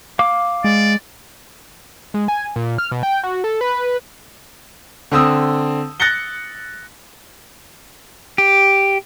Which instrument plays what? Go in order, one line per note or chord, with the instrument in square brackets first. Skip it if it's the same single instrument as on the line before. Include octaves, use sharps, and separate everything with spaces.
[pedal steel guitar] F5 D6
[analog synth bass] G#3 [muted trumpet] D5
[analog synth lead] G#3
G#5
A#2
F6
B2
G5
F#4
A4
B4
[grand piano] D3 C4 D#6 E6
F#6 A6 A#6 C#7 G7
[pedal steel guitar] G4